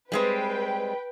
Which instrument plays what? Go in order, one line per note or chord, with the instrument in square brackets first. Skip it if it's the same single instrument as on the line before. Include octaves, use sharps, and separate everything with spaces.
[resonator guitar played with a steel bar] G3 G#3 C4 [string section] B4 G5